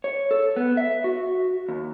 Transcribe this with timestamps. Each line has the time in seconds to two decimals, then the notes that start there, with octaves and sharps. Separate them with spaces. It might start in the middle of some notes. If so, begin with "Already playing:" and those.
0.04 C#5
0.31 A4
0.56 B3
0.77 E5
1.04 F#4
1.69 D#2